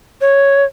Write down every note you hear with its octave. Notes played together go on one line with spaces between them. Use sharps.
C#5